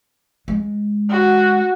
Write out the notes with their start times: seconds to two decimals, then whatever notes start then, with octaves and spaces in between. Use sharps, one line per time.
0.48 G#3
1.10 F#4